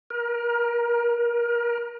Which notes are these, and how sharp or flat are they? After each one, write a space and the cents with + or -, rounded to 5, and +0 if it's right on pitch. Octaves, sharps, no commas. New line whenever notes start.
A#4 +30